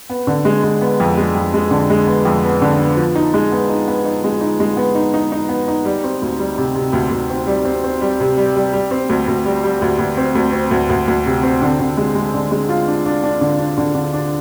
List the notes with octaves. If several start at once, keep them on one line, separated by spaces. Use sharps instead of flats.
B3
D3
G#3
G#3
B3
F2
G#3
F2
G#3
D3
G#3
B3
F2
B3
D3
B3
F3
D#4
G#3
B3
D#4
B3
D#4
G#3
D#4
G#3
B3
D#4
D#4
D#4
B3
D#4
G3
C4
D2
G3
C3
C3
D2
D2
C4
G3
C4
C4
G3
C3
G3
G3
G3
C4
D2
D2
G3
G3
D2
D2
C4
D2
C4
D2
D2
D2
C3
C4
D3
D3
G#3
G#3
D3
G#3
F4
D4
D4
D4
D3
D4
D3
D3
D4